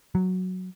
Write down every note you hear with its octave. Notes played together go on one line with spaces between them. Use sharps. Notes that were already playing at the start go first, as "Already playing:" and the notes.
F#3